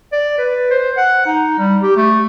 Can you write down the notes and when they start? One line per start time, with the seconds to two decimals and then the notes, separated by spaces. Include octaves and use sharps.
0.12 D5
0.38 B4
0.70 C5
0.97 F#5
1.26 D#4
1.59 G3
1.82 G4
1.96 A3